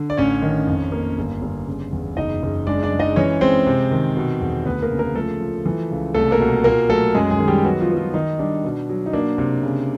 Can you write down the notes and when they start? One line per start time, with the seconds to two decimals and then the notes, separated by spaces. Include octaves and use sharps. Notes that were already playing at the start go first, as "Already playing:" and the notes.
Already playing: D3
0.10 D5
0.17 A1 C#4 C#5
0.42 D#3
0.67 F2
0.92 A#3
1.18 G1
1.42 G1
1.67 C#3
1.93 E2
2.17 F#1 D#4 D#5
2.42 F#1
2.67 G#3 D4 D5
2.83 D4 D5
2.92 G#3
2.99 D#4 D#5
3.16 E3 C#4 C#5
3.41 G#3 C4 C5
3.67 C3
3.91 D#3
4.17 B2
4.41 E2
4.66 D2 B3 B4
4.82 A#3 A#4
4.91 C#3
4.99 A#3 A#4
5.16 F3 A3 A4
5.40 F3
5.66 E3
5.91 C#2
6.14 C2 A3 A4
6.31 A#3 A#4
6.40 B2
6.64 A#2 A#3 A#4
6.89 F#3 A3 A4
7.14 F#2 G#3 G#4
7.31 G#3 G#4
7.39 D#3
7.48 G3 G4
7.64 F#3 B3 F#4
7.81 F3 F4
7.89 B3
7.97 F3 F4
8.14 D#3 D#4
8.39 G3 D4
8.64 B2
8.89 F#3
9.06 D#4
9.13 A#3 D4
9.38 C3
9.63 C#3